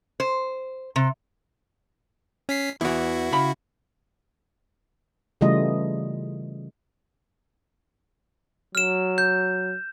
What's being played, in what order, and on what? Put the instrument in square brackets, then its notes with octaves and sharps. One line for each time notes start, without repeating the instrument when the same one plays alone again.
[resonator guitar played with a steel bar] C5
C3
[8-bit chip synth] C#4 B6 C7
[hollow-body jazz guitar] E2 E3 [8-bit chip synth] E4 F#4
[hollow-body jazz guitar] C#3 B5
[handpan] C#3 E3 G3 A3 F4 D#5
[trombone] F#3 [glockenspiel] F6 E7
[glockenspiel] G6